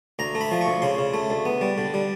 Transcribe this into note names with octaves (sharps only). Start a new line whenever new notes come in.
D2 A#5
A3
B5
F3
C#6
D2
C#3 C6
C#3
A3
D2
B3
G3
D3
G3